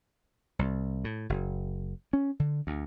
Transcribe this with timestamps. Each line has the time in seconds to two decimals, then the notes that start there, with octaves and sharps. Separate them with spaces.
0.59 C2
1.04 A2
1.29 F#1
2.13 C#4
2.40 D3
2.67 D2